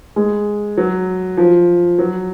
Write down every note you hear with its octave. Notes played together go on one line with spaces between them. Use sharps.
G#3
F#3
F3
F#3